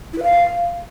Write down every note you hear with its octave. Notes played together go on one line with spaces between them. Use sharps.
E4
B4
F5